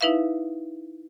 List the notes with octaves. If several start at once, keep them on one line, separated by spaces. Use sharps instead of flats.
D#4 E4 B4 E5 F5